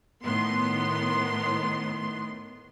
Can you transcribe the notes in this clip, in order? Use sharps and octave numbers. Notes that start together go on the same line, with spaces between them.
A2 D#3 B3 C6